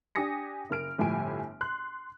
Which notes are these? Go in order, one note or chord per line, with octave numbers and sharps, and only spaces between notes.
D4 G4 G#5 D#6 A#6 C#7
F#1 A#3 F6 D7
G1 A2 F3 G4 G#5 D7
C6 F#6